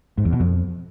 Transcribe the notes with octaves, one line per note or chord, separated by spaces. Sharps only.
G#2
E2
B2
F2